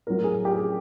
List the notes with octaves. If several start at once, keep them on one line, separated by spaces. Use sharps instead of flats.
A2 F#3 A#4
G#4
G4
G#4